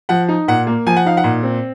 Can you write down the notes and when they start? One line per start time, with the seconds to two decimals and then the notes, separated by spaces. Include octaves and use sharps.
0.09 F3 F#5
0.29 D#4
0.48 A#2 F#5
0.67 A#3
0.86 F3 G#5
0.96 F#5
1.05 D#4 F5
1.17 F#5
1.24 A#2
1.43 C4